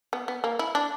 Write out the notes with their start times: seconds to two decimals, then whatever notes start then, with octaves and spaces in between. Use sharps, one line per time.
0.13 B3
0.28 B3
0.44 A#3
0.59 E4
0.75 D4